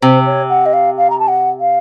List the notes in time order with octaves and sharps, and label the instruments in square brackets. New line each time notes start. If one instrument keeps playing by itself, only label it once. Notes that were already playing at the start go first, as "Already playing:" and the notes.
[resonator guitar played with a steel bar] C3 [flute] C5
[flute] C#5
F#5
D#5
F5
F5
A#5
A5
F#5
F5